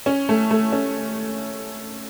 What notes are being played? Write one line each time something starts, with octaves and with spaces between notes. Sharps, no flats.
C#4
A3
A3
C#4